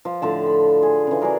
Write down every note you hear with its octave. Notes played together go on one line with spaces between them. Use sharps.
F3 F4
A2 D3 F3 A5
B5
G#4
C#3 E3
D4 F#4 G#4 A#4